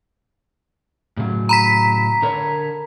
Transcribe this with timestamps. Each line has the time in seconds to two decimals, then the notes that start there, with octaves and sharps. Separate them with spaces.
1.17 A2 C#3 F#3
1.49 A#5 B5 B6
2.22 D3 A#4 C#5